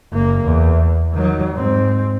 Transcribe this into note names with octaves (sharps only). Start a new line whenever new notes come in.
F#1 A#3
E2
D#3 F#3
G#2 C4